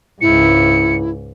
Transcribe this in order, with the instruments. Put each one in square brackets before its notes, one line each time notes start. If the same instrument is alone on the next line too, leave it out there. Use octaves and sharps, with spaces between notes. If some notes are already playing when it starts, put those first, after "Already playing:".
[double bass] C#2 G#2 [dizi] E4 [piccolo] C#7